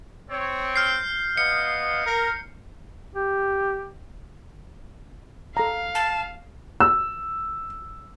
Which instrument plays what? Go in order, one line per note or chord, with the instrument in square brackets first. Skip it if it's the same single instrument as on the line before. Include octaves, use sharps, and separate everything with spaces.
[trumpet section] C4 C#5
[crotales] F6 G6 C7
[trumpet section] B3 D#5 F5 [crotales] C#7
[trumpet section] A#4
[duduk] G4
[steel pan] A4 A#5 [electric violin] F5
[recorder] A5
[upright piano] E6